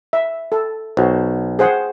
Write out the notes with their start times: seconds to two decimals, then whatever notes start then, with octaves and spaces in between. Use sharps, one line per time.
0.13 E5
0.52 A4
0.97 B1 F#4 C5
1.59 G#4 C5 F#5